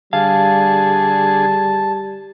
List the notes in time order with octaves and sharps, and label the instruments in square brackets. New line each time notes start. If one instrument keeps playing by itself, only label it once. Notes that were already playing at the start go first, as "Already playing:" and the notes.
[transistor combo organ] D3 G#4 [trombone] G3 [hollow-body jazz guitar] F5 [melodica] A5